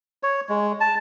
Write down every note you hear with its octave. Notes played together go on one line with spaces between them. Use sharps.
C#5
G#3
A5